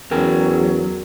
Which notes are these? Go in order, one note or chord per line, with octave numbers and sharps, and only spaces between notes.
E2 F#3 C#4 G#4 A#4 G5